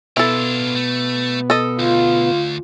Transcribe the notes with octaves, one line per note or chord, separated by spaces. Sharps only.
B2 B3 D4 E4 F4 A4
A3
A4 D#5
D2 F4